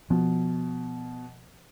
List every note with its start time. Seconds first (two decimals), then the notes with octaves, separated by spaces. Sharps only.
0.10 B2 F3